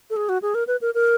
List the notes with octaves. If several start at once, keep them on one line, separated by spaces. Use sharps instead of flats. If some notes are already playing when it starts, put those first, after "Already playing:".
A4
G#4
F#4
G#4
A#4
B4
A#4
A#4